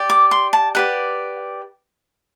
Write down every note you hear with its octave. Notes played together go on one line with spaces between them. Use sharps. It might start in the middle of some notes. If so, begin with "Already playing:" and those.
Already playing: G4 D5
D6
C6
A5
G4 B4 D5 F#5